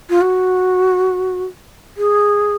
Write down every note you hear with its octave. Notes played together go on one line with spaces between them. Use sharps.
F4
F#4
G#4